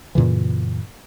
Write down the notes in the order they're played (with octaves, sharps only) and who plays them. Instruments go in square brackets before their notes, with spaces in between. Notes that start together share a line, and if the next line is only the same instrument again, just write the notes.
[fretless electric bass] F#2 A#2 C#3 E3